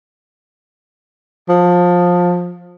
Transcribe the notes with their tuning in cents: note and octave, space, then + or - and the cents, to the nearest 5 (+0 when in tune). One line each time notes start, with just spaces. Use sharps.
F3 +20